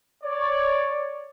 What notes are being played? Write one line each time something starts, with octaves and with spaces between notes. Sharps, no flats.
C#5 D5